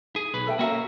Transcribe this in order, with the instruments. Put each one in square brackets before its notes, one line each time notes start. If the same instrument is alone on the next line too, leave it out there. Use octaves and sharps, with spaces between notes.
[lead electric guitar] G#4
B1 B4
[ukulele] A4 E5 G5
[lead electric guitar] A#3 F#4 [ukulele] C#4 E5 A#5